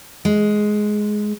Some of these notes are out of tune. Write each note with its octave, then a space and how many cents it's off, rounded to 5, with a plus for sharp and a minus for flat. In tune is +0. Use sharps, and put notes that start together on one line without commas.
G#3 +10